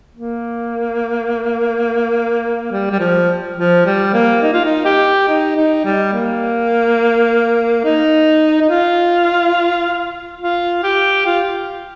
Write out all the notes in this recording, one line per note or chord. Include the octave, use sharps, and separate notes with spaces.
A#3
G3
G3
F3
F3
G3
A#3
D#4
F4
D#4
G4
D#4
D#4
G3
A#3
D#4
D#4
F4
F4
G4
F4